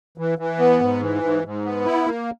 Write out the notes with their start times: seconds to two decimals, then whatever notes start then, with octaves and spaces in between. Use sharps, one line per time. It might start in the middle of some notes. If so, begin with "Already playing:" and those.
0.18 E3
0.38 E3
0.59 B3
0.81 G#2
1.01 E3
1.23 G#2
1.44 G#2
1.64 B3
1.85 E4
2.06 A#3